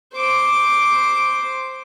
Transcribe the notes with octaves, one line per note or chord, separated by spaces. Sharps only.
C5 D6